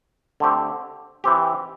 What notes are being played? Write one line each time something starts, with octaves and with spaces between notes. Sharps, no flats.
D3 A3 C4 G4
E3 C4 G4